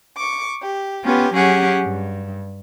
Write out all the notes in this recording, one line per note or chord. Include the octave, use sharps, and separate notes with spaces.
C#6 D6
G4
B3 C#4 F4 G4
F#3 C#4 G4 G#4 F#5
G2